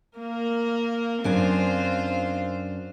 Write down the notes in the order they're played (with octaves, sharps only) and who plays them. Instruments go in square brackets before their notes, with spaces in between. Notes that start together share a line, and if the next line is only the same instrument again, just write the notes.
[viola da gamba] A#3 A#4
[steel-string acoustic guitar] F#2 D4 G#5 [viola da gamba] C4 F4 C5